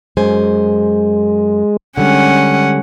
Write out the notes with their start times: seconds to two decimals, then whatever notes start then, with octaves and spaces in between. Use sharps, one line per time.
0.17 F#2 G#3 C5 G#5
1.98 D3 G3 G#3 C#4 F#5